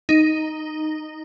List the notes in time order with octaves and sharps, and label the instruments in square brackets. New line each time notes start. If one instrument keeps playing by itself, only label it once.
[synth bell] D#4